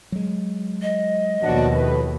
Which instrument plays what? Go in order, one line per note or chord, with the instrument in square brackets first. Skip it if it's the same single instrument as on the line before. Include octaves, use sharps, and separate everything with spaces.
[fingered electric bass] F#3 G#3
[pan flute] D#5
[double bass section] D#2 B2 [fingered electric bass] F3 [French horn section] F#3 D4 F#4
[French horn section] A2 B4